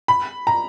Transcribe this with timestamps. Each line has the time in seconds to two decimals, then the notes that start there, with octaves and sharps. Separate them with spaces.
0.08 B5
0.47 A#5